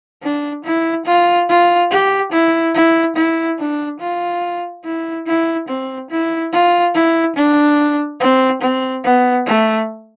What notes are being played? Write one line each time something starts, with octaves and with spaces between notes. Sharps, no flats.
D4
E4
F4
F4
G4
E4
E4
E4
D4
F4
E4
E4
C4
E4
F4
E4
D4
C4
C4
B3
A3